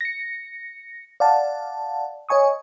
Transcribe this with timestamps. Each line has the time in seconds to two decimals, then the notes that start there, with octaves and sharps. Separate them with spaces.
0.01 A#6 C#7
1.20 D5 F5 F#5 A5
2.29 C#5 D#5 G#5 C#6 D#6